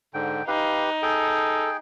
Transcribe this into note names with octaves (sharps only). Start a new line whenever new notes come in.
G#2 D3 G5
D#4 G4 B4 F5
G#4 A4 G5